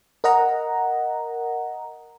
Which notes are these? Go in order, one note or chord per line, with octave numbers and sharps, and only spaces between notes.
A#4 D#5 F#5 A#5